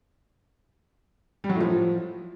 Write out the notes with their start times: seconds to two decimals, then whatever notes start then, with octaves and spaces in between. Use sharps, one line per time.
1.44 G3
1.49 F#3
1.55 A2
1.60 F3